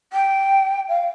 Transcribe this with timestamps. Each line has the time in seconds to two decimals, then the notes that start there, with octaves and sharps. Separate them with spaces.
0.13 G5
0.89 F5